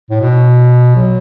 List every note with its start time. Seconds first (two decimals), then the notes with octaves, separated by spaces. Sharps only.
0.11 A2
0.21 B2
0.96 F#3